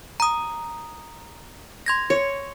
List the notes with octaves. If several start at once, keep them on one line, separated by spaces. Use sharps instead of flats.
A#5 D#6
C6 G#6 A#6
C#5